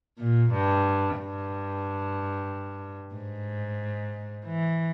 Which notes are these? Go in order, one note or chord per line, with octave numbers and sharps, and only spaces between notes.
A#2
G2
G2
G#2
E3